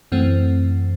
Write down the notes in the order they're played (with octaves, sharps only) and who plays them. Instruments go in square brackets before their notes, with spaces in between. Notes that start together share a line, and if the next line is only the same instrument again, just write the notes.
[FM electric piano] F#2 E3 A3 C4